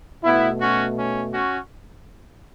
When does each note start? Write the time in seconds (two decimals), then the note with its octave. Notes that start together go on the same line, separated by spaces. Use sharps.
0.24 B2 A3 B3 E4
0.61 C#4 F#4
0.98 C#4
1.34 C#4 F#4